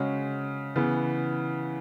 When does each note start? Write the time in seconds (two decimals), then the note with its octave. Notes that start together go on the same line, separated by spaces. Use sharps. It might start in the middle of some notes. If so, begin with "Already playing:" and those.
Already playing: C#3 G#3 C#4 F#4
0.76 C#3 E3 B3